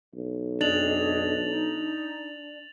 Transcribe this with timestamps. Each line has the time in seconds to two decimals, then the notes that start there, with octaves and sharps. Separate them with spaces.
0.15 B1
0.61 F2 D4 G#4 D#5 A6 F7 F#7
1.48 D#4